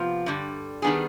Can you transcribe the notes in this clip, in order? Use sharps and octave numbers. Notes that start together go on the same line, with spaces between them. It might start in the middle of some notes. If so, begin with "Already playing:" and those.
Already playing: C3 F3 B3 F4
G2 D3 G3
D#3 G3 B3 D4 G#4